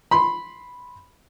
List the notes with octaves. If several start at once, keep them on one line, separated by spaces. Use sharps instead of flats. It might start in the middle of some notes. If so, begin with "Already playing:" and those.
B5 C6